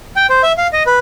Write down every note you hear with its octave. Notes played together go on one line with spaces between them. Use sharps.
G5
C5
E5
F5
D#5
B4